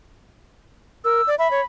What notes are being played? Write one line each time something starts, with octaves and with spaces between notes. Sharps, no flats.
A#4 E6
D5
E5 B5
C#5